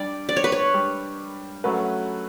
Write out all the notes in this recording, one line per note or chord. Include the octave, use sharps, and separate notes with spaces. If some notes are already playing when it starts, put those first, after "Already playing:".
Already playing: G3 D4 G4 D5
D5
C#5
B4
C#5
G3 D4 G4
F#3 A3 C#4 F#4 B4